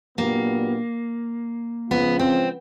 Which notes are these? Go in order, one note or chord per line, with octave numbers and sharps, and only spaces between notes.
A#2 F#3 A#3 B3 D4 G4
C#3 F3 G#3 B3 C#4 F4
C4